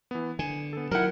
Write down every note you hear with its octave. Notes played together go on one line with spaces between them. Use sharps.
E3 B3
D3 G#5
B3 A4
D#3 F#3 E4 A#4 F#5